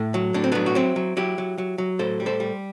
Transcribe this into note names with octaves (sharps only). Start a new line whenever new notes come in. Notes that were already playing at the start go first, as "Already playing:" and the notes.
Already playing: A2 A3
F#3
A2 D4
C4
F#3 B3 D4
F#4
F#3 C4 E4
F#3
F#3 E4 G4
F#3
F#3
F#3
A2 A4 C5
G3
A4 C5
G3